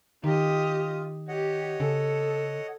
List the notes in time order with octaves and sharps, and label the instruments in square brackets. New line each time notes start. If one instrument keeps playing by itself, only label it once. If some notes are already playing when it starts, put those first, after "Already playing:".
[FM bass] D#3 [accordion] F4 [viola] G4 D#5
[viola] G4 [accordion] C#5 D#5 F#5
[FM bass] C#3 [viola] A4